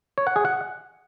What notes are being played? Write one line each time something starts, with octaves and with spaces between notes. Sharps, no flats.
C#5
F#5
G#4
F#5